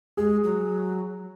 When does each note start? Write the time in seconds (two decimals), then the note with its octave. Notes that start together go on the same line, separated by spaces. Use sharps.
0.17 G#3 G#4
0.44 F#3